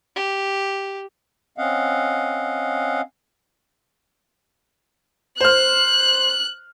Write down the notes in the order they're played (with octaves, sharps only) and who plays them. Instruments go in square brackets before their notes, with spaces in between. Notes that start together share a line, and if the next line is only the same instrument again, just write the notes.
[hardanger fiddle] G4
[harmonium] C4 C#4 D#5 F5 F#5
[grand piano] C5 F6 [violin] F#6